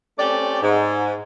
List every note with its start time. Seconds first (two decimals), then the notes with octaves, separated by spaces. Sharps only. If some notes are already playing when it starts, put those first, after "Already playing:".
0.19 A3 C4 C#4 G4 D5
0.62 G#2